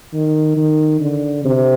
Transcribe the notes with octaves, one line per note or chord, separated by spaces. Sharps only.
D#3
D#3
D3
C3